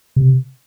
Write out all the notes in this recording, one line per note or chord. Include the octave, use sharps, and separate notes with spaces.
C3